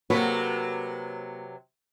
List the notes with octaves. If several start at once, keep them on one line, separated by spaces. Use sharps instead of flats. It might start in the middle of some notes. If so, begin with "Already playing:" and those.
C3 F#3 A#3 F#4 A4 B4